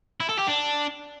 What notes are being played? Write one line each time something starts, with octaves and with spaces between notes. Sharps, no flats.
E4
A4
G4
D4